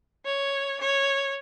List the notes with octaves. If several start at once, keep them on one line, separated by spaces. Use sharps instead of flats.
C#5
C#5